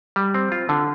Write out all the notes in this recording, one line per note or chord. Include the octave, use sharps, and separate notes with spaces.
G3
C4
F4
D3